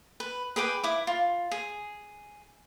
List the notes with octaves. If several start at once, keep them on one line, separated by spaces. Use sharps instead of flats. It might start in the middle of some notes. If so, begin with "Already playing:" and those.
B4
G#4 B4 G5 D6
E4 D6
F4
G#4